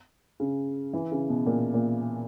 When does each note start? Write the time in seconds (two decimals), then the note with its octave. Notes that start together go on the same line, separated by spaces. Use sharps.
0.40 C#3
0.93 E3
1.12 C#3
1.29 B2
1.46 A#2
1.74 A#2